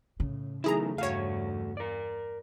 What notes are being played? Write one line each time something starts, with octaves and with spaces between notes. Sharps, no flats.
A2 C#3
F#2 D#3 E3 A3 E4 G#4 A#5
E2 G2 A3 F#4 C#5 F5
A#4 D5